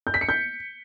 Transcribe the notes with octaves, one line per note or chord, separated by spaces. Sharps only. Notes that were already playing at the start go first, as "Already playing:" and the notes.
G6
B6
C#7
G6